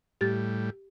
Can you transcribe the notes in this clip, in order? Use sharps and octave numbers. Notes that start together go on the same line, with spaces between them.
A2 G3 G4 A6